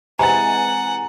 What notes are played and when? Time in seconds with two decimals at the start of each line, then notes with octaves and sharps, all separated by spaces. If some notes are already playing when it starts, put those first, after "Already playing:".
0.19 C3 E3 G#3 F#5 G#5 A#5 A6